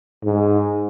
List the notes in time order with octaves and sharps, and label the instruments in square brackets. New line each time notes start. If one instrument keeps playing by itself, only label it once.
[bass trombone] G#2